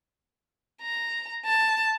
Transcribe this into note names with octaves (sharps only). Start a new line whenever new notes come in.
A#5
A5